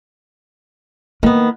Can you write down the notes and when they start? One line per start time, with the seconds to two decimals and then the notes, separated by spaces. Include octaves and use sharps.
1.23 D#3 A#3 B3